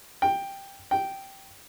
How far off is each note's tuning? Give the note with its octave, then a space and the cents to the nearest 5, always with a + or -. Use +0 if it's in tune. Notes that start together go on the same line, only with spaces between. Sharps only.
G5 +5
G5 -10